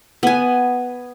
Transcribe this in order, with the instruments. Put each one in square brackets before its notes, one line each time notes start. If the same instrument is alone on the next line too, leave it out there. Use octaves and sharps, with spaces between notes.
[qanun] B3 G#5